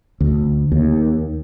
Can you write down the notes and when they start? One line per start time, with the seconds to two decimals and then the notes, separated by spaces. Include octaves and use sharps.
0.21 D2
0.72 D#2